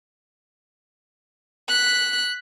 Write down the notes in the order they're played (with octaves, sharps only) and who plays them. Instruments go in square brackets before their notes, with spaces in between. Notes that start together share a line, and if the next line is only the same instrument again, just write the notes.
[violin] F#6 B6